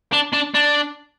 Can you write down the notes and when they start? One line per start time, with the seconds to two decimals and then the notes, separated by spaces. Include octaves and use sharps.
0.12 D4
0.33 D4
0.54 D4